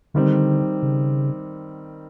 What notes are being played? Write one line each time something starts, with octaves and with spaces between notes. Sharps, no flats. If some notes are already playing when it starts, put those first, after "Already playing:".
D3 D#3 G3 C4
C#3